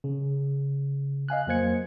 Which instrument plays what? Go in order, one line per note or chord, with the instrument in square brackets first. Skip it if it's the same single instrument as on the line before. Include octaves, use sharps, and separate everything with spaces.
[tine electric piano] C#3
D#5 F5 G#5 F#6
F2 F#3 A#3 C5 G#6 C#7